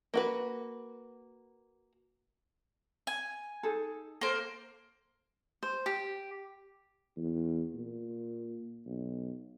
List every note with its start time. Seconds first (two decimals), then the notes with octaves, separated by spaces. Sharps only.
0.14 A#3 F#4 B4
3.07 G#5
3.63 D#4 G#4 A4
4.21 A#3 A4 C5
5.63 C5
5.86 G4
7.17 E2
7.75 A#2
8.86 B1